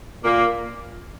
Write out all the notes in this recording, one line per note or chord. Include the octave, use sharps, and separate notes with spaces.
A#2 A#3